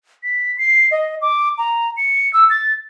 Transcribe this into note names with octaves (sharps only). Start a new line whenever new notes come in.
B6
C7
D#5
D6
A#5
C#7
E6
A6